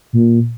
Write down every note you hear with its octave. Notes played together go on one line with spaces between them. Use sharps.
A#2